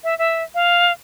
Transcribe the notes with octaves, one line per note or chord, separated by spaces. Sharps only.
E5
E5
F5